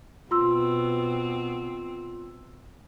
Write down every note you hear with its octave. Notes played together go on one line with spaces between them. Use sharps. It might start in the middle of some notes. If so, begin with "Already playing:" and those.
B2 C4 F4 C6 E6